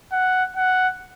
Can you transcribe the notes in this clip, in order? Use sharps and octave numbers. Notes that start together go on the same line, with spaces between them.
F#5
F#5